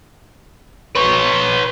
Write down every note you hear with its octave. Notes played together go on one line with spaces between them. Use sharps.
B4 C#5